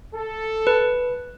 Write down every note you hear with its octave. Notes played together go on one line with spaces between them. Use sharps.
A4
B4